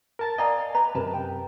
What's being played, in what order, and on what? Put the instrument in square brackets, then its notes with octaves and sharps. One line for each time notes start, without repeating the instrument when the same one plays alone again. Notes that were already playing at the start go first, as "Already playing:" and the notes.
[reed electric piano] A#4 A5 A6
[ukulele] D5 F5 A#5 [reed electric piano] D#5 G#5
[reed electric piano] B4 [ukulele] A#5
[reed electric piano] F#2 C3 [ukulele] A#4 B4 A5
[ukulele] G5